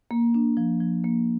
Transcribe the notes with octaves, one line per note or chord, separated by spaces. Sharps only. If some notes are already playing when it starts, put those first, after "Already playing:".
A#3
D4
F3
F3
A#3